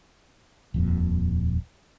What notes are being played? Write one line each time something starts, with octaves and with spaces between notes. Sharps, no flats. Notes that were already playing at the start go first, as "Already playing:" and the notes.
D#1 F2 A#2